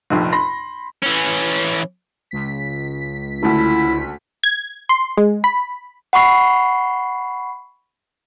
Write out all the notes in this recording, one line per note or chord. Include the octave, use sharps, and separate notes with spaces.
F1 A#1 F2
B5 C6 A#6
E3 C#4
C#2 B6
D2 A3 E4
G#6
C6
G#3
B5
F#5 B5 C#6 C7